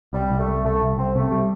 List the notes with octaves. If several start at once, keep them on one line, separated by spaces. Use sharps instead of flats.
C2 G3
C2
A3
C2
C2 A3
C2
C2 C4
C3 A3
G3